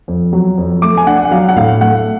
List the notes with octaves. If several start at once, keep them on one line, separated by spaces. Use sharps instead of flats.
F2
F#3
F2
A3 D6
G#5
D4 F#5
F#5
F#3 F5
F#5
A2 F5
A3 F#5